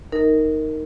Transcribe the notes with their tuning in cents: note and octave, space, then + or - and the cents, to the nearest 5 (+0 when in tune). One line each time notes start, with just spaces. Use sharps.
D#4 +0 A#4 -10 D#5 +30